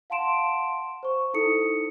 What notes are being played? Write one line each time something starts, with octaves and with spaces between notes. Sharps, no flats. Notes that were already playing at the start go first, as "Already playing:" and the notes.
F5 F#5 A5 C6 D7 E7
C5 C#6
D#4 E4 A4 D#6 C#7